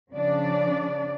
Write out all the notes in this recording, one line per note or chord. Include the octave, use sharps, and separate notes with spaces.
C#3 F3 D4 D5